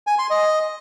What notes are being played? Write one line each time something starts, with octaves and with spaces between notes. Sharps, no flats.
G#5
C6
D#5